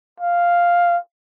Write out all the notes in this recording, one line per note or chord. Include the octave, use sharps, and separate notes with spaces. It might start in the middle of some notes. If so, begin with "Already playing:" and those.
F5